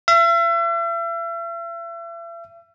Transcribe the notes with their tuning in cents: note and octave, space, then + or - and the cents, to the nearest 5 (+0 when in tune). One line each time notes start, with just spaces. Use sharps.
E5 +40